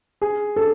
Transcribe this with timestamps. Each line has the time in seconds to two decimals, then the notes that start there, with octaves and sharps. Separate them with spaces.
0.21 G#4
0.56 A4